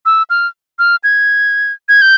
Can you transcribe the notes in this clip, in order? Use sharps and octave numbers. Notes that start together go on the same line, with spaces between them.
E6
F6
F6
G#6
G#6
G6